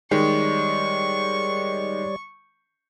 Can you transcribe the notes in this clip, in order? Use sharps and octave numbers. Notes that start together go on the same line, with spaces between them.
D#3 G3 G#3 C#5 D5 C#6